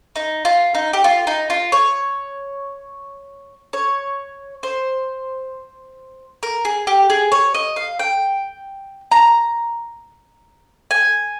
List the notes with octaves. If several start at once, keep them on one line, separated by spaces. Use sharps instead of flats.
D#4
F4
D#4
G4
F4
D#4
F4
C#5
C#5
C5
A#4
G#4
G4
G#4
C#5
D#5
F5
G5
A#5
G#5